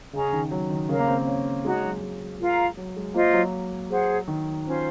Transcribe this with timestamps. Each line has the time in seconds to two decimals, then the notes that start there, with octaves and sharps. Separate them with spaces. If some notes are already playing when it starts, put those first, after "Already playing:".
0.13 C#3 C#4 G#4 D#5 A#5
0.33 D#3
0.51 F#3
0.70 D#3
0.89 C#3 A#4 C#5 F5 A#5
0.99 A#3
1.08 C4
1.27 C#4
1.64 G#3 D#4 F#4 C#5
1.83 F#3
2.02 G#3
2.40 F4 A#4 F5 A#5
2.77 F#3
2.96 G#3
3.14 A#3 F4 C5 D#5
3.33 F#3
3.90 G#4 C5 F#5
4.28 D#3
4.66 C#4 F4 C5 F5